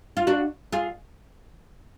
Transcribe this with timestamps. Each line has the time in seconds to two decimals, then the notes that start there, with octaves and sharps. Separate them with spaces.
0.17 F4
0.27 D4 F#4
0.72 F4 G#4